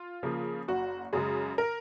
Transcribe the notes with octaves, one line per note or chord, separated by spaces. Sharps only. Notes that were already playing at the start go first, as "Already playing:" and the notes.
Already playing: F4
C#3 F3 A#3
F#1 F#4
F#2 C#3 G#3 G#4
A#4